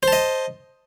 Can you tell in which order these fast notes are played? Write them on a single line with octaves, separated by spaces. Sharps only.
C5 A5 D#5